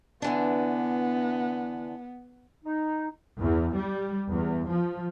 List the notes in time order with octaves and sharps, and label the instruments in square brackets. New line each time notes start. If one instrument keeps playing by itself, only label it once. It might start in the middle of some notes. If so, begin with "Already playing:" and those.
[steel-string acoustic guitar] D3 E3 D4 [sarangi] B3
[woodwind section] D#4
[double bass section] E2
G3
E2
F3